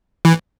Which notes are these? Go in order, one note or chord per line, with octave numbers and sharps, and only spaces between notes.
E3